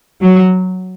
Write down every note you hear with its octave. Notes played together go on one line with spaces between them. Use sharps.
F#3